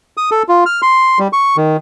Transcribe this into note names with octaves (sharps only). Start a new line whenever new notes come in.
D#6
A4
F4
F6
C6
G3
C#6
D#3